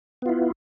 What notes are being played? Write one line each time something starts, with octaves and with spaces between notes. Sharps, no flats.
B3 E4 F4